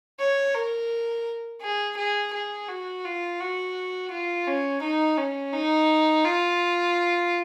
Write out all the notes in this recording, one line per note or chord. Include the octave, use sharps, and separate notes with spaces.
C#5
A#4
G#4
G#4
G#4
F#4
F4
F#4
F4
C#4
D#4
C#4
D#4
F4